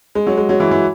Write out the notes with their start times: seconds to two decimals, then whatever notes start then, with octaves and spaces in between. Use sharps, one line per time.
0.15 G#3
0.27 F#3
0.37 G#3
0.49 F#3
0.60 E3
0.71 E3